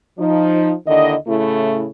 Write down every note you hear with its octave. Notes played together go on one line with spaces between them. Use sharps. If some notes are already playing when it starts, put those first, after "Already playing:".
F3 D#4
D#2 D3 D#3 E4 D#5
A2 C#3 A3 E4